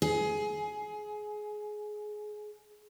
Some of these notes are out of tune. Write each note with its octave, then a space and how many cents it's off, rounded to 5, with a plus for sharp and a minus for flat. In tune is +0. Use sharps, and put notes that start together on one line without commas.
G#4 +20